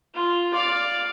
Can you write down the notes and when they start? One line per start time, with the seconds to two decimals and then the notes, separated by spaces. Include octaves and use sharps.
0.14 F4
0.54 D5 F5